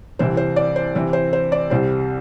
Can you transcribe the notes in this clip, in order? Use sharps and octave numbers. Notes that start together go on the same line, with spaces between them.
C2 C3 E3 C4 C5
C5
D5
C5
C3 E3 C4
C5
C5
D5
C2 C3 G3 C5